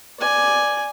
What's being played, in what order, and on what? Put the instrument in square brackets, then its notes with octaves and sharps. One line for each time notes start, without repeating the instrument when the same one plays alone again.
[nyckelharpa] D5 G#5